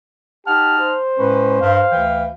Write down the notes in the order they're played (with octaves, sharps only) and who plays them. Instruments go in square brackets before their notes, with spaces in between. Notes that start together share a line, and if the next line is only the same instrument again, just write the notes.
[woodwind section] D#4 F#5 F6 [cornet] G4 [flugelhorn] A5
[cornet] C5
[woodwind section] A2 G#3 C#4 [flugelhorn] B4
[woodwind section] G2 [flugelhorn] F5
[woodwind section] D2 E3 G5